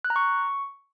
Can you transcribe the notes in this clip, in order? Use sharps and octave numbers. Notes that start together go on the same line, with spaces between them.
F#6
A#5
C#6